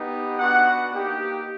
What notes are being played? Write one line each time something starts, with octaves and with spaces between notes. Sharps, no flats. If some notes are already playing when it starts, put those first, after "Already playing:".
Already playing: B3 D#4 G4
B3 D4 F#4 F#5
A#3 D#4 G4